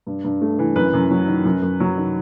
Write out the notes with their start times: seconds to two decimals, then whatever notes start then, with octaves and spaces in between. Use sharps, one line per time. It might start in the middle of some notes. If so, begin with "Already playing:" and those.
0.07 G2
0.24 G2
0.41 A3
0.59 E3
0.76 F#2 B4
0.93 F#2
1.10 F#3
1.28 D#3
1.45 F#2
1.62 F#2
1.80 F#3
1.97 D#3